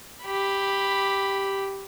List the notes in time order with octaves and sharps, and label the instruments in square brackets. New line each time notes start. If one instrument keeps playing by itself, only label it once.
[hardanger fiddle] G4 B5